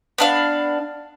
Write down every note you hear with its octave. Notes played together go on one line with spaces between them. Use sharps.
B3 D4 F5